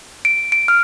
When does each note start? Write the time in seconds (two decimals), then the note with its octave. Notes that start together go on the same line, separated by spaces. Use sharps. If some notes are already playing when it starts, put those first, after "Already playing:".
0.25 D7
0.52 D7
0.68 F6